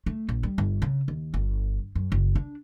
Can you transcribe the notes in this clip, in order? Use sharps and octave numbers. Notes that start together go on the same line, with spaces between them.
A3
A#1
G3
G1
C#3
D#2
G1
F#2
F#1
D4